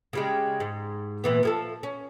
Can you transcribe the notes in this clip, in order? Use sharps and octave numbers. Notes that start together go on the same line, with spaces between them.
C#3 G3 G#3
G#2
A#2 E3 B3
F3 G#4 A4
C#4